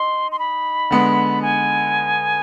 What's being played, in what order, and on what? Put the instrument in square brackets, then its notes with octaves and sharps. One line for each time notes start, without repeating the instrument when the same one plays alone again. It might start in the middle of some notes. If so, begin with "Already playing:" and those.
Already playing: [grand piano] D#4 [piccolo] C6
[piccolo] C6
B5
[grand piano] D3 G#3 B3
[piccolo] G#5